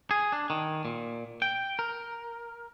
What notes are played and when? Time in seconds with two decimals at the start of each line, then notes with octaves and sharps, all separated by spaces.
0.11 G#4
0.32 D4
0.50 D#3
0.85 A#2
1.42 G5
1.79 A#4